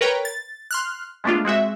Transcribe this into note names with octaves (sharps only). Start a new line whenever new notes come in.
A#4 B4 C#5 G5 A#5
A6
C6 F6 F#6
G#3 A3 B3 D4 F4
G#3 C4 F#4 E5